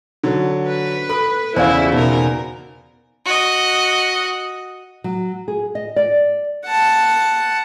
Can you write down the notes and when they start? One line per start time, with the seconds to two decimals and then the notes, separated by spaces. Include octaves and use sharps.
0.23 D3 F#3
0.67 B4
1.09 A4 B5
1.56 E2 C#3 E4 C5 D5 F5
1.92 B2 D#4 A#4
3.26 F#4 D#5
5.04 F#3
5.48 G#4
5.75 D#5
5.96 D5
6.66 F#5 A5